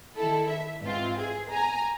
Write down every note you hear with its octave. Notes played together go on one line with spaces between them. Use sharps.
D#3 E4 A4
E5
G#2 E3 C4 F4
G#4
G#5 A#5